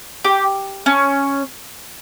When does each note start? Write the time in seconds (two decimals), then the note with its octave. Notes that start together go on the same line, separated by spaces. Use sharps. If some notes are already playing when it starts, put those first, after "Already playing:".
0.24 G4
0.86 C#4